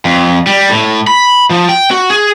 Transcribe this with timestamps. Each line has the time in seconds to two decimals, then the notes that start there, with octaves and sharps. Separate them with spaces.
0.05 F2
0.47 G3
0.69 A2
1.07 B5
1.50 F3
1.69 G5
1.91 F#4
2.10 G#4